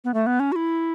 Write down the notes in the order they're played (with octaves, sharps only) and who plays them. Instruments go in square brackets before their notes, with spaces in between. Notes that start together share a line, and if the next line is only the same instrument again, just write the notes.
[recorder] B3
A3
B3
C#4
F#4
E4